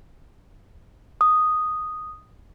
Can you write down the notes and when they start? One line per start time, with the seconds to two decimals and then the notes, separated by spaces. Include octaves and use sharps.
1.21 D#6